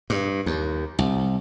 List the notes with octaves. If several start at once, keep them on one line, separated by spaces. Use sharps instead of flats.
G2
D#2
C2